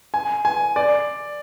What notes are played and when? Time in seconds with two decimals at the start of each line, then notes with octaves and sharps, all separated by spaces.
0.14 G#5
0.45 G#5
0.76 D5